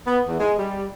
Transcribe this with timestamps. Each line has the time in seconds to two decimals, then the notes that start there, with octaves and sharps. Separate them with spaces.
0.07 B3
0.28 E2
0.40 G#3
0.58 G3